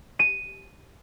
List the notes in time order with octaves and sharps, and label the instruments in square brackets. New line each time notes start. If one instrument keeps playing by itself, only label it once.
[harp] D#7